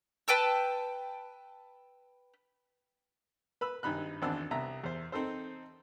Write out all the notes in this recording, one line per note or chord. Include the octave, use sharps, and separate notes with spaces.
B4 G5 A5 E6
B4 B5 E6
G#1 G2 D#4 B5 F#6
G#1 E2 C4 D4 F#5 E6
C2 B3 E5 A#5
E2 C5
C4 D#4 A4 C5